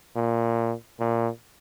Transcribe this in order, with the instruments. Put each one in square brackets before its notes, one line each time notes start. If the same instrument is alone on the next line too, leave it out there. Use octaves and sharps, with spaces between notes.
[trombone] A#2
A#2